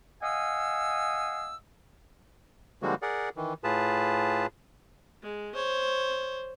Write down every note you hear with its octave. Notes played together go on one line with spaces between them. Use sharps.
D#5 F5 F#5 G#5 D#6 E6
D3 F3 G3 G#3 A#3 F#4
G#4 A#4 D5 F#5
D#3 E3
A2 F4 G#4 B4 A5
G#3
C5 C#5